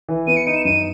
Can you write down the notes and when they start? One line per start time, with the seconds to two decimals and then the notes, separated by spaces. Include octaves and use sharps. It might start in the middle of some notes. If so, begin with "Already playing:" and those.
0.09 E3
0.27 B3 D#7
0.37 C#7
0.47 D#4 D#7
0.56 E7
0.65 F#2 D#7